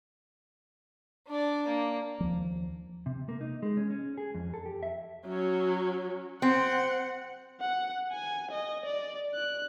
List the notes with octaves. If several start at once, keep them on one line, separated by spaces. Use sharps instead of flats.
D4 D5
A#3
D#2 F3
C3
A#3
D#4
G#3
C#4
C#4
G#4
F2
A4
G4
E5
F#3 C#4
C4 F#5
F#5
G#5
D#5
D5
F#6